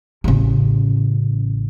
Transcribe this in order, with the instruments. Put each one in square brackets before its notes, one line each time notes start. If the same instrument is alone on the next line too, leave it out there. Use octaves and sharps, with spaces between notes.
[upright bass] A1 C#3